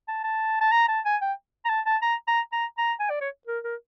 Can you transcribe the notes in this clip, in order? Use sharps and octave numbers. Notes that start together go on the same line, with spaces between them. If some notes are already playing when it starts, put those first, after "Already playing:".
A5
A5
A5
A#5
A5
G#5
G5
A#5
A5
A5
A#5
A#5
A#5
A#5
G#5
D5
C#5
A#4
A#4